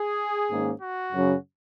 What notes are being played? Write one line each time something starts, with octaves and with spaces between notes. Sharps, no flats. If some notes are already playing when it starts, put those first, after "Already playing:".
Already playing: G#4
G#2 D#3 A#3 C#4
F#4
F#2 C#3 F#3 C#4